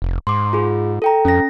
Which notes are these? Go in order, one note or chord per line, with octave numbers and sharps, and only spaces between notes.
F1
G#2 C6 D6
F4 G#4
A4 G5 A#5
F2 C#4 A#6